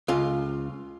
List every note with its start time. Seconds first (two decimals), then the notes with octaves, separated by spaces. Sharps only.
0.08 C#2 F4